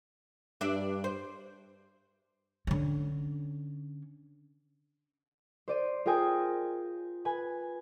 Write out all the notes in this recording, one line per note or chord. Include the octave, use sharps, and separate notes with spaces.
G2 D4 E5
C5
D3 C#4
C5 D5 D#7
F4 G#4 A#4 G5 G#5 D#6
B4 G#5 G#6